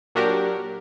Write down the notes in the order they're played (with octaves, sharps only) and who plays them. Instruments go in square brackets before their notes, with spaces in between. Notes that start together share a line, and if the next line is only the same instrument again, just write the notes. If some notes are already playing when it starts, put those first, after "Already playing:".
[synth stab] A#2 F#3 D4 F#4 G4 A#4